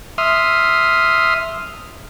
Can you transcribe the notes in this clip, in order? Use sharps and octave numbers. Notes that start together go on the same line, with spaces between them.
E5 C6 D#6 F6